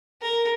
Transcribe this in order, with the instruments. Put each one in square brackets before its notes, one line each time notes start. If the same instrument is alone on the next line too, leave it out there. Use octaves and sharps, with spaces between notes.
[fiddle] A#4